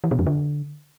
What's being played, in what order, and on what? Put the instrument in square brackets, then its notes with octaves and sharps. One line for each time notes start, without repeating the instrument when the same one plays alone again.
[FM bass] E3
B2
F2
D3